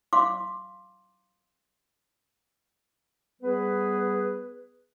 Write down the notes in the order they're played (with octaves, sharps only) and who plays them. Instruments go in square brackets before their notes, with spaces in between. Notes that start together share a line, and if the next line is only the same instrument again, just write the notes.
[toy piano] F5 C6 D6
[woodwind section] G3 B3 G#4 B4